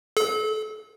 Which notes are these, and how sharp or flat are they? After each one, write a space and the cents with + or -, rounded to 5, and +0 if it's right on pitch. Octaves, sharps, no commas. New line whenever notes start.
A4 -35